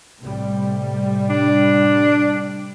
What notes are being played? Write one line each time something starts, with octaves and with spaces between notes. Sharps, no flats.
A2 C3 G3
D4